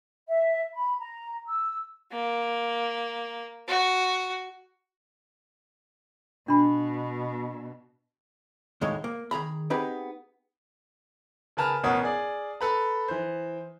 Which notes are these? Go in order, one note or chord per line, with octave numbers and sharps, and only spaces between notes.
E5
B5
A#5
E6
A#3
F#4
B2 D4 B5
D#2 A2 G#3 D#4 C#5
A#3
D#3 G#4 A#5 B5
B3 C4 D#4 G4 G#4 B4
C#3 A#4 B4 A5 A#5 F6
A1 B2 B3 A#4 C#5 D#6
G#4 D5
A4 B4 A#5
E3 C5